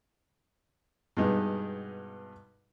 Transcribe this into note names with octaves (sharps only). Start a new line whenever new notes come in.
G2 B2 G#3 B3 D#4